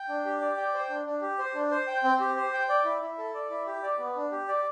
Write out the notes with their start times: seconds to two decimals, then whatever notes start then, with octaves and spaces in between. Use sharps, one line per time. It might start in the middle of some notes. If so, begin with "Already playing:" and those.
Already playing: G5
0.09 D4
0.25 G4
0.41 D5
0.57 G5
0.74 C5
0.90 D4
1.06 D4
1.22 G4
1.39 C5
1.55 D4
1.71 C5
1.87 G5
2.04 C4
2.20 G4
2.37 C5
2.53 G5
2.69 D5
2.85 E4
3.01 E4
3.18 A4
3.34 D5
3.50 E4
3.67 G4
3.83 D5
3.99 B3
4.16 D4
4.32 G4
4.48 D5